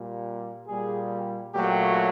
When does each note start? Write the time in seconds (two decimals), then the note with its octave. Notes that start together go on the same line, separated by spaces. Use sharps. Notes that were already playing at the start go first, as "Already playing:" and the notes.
Already playing: A#2 G3
0.68 A#2 G3 G#4
1.54 A#2 F#3 A3 G4